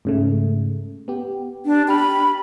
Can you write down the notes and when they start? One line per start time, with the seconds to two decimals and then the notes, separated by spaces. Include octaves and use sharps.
0.05 G#2 C#3 A3
1.08 B3 G4
1.66 D4
1.88 G4 B5 F6